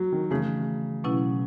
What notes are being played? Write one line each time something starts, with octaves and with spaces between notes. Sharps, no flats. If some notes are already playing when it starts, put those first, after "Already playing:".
Already playing: F#3
D#3
C#3 E3 A3 C#4
B2 F#3 C#4 E4